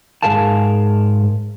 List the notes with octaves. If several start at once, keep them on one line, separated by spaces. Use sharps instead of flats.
G#2 F3 G#4 A#4 F5 A5